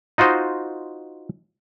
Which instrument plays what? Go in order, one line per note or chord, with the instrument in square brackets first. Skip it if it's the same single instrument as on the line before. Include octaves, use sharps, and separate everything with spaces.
[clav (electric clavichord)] D#4 F4 F#4 C5 D#5